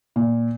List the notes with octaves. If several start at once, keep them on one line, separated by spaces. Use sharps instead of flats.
A#2